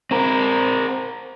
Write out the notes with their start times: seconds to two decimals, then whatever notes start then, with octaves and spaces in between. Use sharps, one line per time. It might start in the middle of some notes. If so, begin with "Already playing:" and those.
0.11 C4 A#4